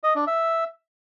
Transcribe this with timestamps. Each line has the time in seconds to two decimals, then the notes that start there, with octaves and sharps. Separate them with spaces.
0.03 D#5
0.15 D4
0.27 E5